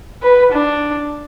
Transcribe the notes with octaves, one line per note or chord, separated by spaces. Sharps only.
B4
D4